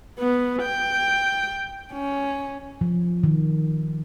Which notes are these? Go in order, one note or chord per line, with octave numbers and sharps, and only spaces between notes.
B3
G5
C#4
F3
D#3